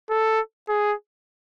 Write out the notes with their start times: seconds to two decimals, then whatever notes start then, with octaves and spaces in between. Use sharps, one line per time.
0.10 A4
0.69 G#4